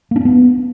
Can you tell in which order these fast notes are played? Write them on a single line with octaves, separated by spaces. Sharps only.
A#3 D4 C#4 B3